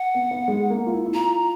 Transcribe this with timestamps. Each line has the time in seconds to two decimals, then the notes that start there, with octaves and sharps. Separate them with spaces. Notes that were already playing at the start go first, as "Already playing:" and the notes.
Already playing: F#5
0.15 B3
0.31 B3
0.48 G#3
0.70 A#3
0.86 F4
0.92 E4
1.06 E4
1.14 F4 A#5